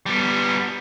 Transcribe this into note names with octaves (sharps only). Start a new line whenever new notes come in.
G3 B3